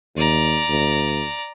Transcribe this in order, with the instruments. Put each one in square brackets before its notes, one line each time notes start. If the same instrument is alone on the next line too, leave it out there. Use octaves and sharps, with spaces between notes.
[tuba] D#2 [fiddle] D5 A#5
[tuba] D2